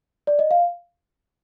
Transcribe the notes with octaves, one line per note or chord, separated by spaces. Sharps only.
D5
D#5
F5